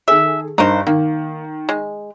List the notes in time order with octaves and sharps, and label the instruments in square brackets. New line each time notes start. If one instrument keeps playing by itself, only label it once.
[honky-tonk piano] D#3 G#4 A4 [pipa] E5
[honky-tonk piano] G2 [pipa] D#4 A#4 C5
[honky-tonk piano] D#3 [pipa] A#3
[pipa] G#3